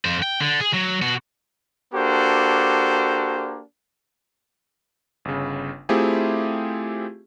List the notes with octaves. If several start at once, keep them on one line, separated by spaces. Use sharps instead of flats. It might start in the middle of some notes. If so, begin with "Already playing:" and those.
F2 C5
G5
D3
G#4
F#3
B2 F#4
A#3 D4 F#4 G4 A4 C5
G1 C#3
A3 C4 E4 F4 G4 G#4